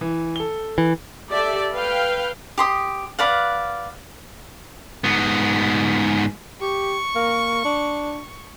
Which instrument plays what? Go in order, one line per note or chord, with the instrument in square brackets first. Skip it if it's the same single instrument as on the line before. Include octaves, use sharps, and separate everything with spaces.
[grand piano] E3
A4 G7
[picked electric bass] E3
[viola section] G4 A4 D5 E5
B4 F5 G5
[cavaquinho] G4 C6 D#6
B4 D5 F5 F#5
[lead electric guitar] G#2 B3
[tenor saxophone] G4 [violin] C#6
[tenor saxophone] A#3
D4